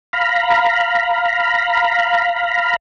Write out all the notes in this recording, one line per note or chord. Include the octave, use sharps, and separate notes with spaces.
F5 A#5 B5